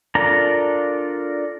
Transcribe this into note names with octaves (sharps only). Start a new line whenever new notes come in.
D4 F4 A4 A#4 A#5